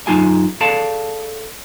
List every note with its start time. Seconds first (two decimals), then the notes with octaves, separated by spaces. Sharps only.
0.07 F#2 F#3 D#4 F4 G#4 G#5
0.61 G#4 A4 D5 F5 A5